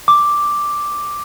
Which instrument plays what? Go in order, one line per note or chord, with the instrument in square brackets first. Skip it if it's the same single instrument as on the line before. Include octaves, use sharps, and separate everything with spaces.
[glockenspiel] D6